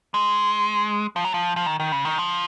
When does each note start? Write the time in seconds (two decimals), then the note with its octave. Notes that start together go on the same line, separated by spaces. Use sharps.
0.14 G#3
1.16 F3
1.25 F#3
1.34 F3
1.56 F3
1.66 D#3
1.80 D#3
1.92 C#3
2.05 D#3
2.19 F3